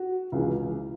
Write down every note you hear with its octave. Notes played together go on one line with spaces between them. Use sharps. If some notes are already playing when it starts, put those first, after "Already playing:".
Already playing: F#4
C#2 C#3 E3